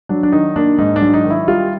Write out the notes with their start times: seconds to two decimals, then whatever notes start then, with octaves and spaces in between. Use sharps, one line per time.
0.09 F#3 D4
0.23 D4
0.32 D#3 D#4
0.56 A#3 D4
0.79 G#2 D#4
0.96 D4
1.02 F#3
1.14 D#4
1.25 D#3
1.30 E4
1.48 G3 F4